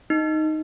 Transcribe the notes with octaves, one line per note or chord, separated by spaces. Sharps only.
D#4